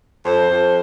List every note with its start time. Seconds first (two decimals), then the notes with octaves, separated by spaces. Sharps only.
0.24 F2 C5
0.50 F2